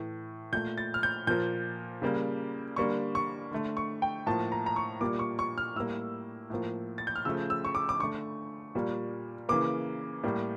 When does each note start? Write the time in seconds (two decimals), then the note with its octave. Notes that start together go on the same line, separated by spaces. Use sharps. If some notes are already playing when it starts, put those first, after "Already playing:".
Already playing: A2 E3 A3
0.52 A#2 A3 G6
0.78 A6
0.94 F6
1.03 G6
1.27 A#2 F3 A#3 G6
2.02 C#3 G3 A#3
2.76 D3 G3 A#3 C#6
3.15 C#6
3.51 D3 A3
3.77 C#6
4.02 G5
4.27 A2 F3 A#3 A5
4.52 A#5
4.66 A#5
4.76 C#6
5.01 A#2 G3 A#3 D6
5.19 C#6
5.39 C#6
5.58 F6
5.75 A2 G3 A#3 E6
6.50 A2 F3 A#3
6.98 A6
7.07 G6
7.16 F6
7.25 C#3 F3 A3 E6
7.50 E6
7.65 C#6
7.75 D6
7.89 D6
7.99 D3 A3 C#6
8.75 A#2 G3 A#3
9.49 C#3 E3 A#3 D6
10.23 A2 G3 A#3